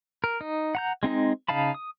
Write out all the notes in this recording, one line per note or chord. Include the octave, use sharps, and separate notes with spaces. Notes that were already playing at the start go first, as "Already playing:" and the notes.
A#4
D#4
F#5 A#5 G6
G#3 C4 D#4 D#5
C#3 D#4 F5 A5 B5
D#6